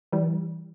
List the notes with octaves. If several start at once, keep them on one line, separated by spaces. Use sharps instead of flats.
E3 G3